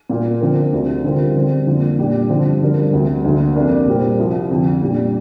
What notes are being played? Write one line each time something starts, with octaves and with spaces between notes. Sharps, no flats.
A#2 A#3 F4 A#4
D3 F3 C4 A#4
D2 C3 F3 D4
D3 G3 C4 F4 A#4
D3 G3 C4
F2 D3 A#3 F4
A#2 G3 D4 G4
G2 D3 F3 C4
G2 D3 F3 D4 A#4
D2 C3 G3
D2 D3 A#3
F2 C3 A#3 D4 A#4
A#2 G3 C4 A#4
C2 C3 F3
F2 D3 F3
A#2 G3 D4